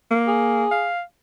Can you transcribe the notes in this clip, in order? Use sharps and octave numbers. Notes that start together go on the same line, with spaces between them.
A#3
G#4
F5